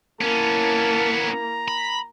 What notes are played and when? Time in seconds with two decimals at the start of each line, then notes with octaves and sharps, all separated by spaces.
0.21 A#3 B3 C#4 E4 A5
1.18 A#5
1.68 B5